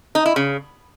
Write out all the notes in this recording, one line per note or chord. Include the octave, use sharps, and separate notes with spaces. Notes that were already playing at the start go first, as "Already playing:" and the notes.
D#4
E4
C#3